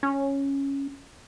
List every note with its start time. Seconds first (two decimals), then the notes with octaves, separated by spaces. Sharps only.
0.03 C#4